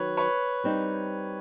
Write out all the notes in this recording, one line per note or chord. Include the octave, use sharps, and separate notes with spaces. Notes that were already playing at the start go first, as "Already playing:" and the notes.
Already playing: D#3 F#3 B4 C#5
B4 C#5
G3 C4 D#4